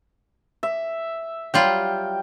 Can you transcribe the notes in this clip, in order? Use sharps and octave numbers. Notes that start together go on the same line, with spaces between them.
E5
F#3 G3 F4 G5